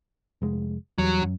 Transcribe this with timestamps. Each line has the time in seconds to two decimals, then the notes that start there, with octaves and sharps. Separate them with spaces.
0.42 F1 G#3
0.98 E2 F#3 G3
1.22 F#2